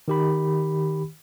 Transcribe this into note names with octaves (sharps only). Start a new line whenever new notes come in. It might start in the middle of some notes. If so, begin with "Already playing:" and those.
D#3 G4 B5